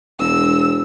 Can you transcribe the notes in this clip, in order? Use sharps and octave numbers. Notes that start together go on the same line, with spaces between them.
E1 E6